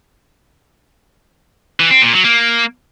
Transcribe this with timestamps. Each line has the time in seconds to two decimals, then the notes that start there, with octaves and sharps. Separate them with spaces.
1.80 E3
1.91 C4
2.02 A#2
2.13 F#3
2.24 A#3